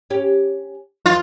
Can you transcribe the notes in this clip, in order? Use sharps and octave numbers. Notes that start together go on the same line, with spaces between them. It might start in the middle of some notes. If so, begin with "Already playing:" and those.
C#4 G4
E2 F4